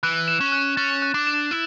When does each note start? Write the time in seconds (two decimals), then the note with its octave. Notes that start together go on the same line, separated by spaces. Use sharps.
0.03 E3 F#6
0.28 E7
0.41 C#4
0.52 F#6
0.77 C#4 A6
1.02 F#6
1.14 D4
1.27 E7
1.51 E4